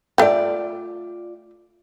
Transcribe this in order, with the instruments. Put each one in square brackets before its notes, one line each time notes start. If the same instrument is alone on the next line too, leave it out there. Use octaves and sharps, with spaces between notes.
[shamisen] A3 G5 [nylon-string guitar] F4 D5